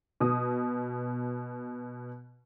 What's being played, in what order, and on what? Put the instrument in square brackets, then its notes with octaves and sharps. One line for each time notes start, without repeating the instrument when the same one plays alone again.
[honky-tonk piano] B2 D#6